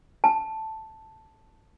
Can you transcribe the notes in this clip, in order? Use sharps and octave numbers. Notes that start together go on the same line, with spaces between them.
A5